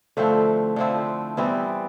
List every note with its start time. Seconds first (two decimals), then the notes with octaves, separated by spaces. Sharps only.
0.17 D3 F3 A3 C4 E4
0.76 D3 F3 C4 E4
1.37 E3 G3 B3 C4 E4